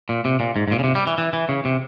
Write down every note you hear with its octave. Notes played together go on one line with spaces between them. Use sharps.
A#2
C3
A#2
G#2
G#2
A#2
C#3
C3
G3
E3
E3
E3
C#3
C3